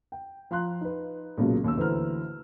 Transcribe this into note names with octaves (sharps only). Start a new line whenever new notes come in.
G5
F3 F5 A#5 C6 F#6
D#4 B4
B1 A#2 C#3 F#3 G#3 A#3
D#2 C#4 E6
D2 E3 B4 C5 A#5 F6